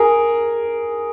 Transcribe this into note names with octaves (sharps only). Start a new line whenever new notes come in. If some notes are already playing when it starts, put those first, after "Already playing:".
Already playing: G#4 A#4